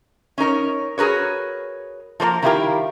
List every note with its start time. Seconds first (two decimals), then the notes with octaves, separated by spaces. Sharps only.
0.38 C#4 D#4 A#4 C#5
0.98 F#4 G#4 A#4 B4 C#5
2.20 F3 A#3 C5 A#5
2.42 D#3 G3 E4 F4 G4 A#4